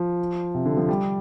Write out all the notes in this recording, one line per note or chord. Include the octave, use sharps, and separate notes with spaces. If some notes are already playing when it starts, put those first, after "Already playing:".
Already playing: F3
C3
D3
F3
G3